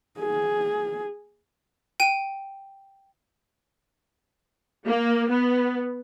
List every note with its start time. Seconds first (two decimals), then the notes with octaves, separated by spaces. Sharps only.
0.20 G#4
2.00 G5 D#7
4.86 A#3
5.29 B3